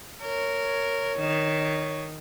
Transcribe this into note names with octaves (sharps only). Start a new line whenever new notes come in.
A#4 C#5
D#3